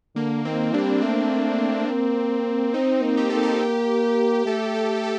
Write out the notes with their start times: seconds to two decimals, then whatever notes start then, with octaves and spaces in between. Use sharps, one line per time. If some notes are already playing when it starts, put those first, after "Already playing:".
0.16 D3 A#3
0.45 D#3 C4
0.74 G3 D4
1.01 A3 C4
1.88 A#3
2.74 C4 D#4
3.02 A#3
3.17 G4
3.30 A#3 A4
3.43 G4
4.46 A3 A4
4.74 A4
4.96 G4
5.04 A4